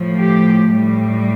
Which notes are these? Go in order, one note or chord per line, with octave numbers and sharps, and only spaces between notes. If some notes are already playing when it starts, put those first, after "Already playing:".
Already playing: A2 F3
G4
A2 G3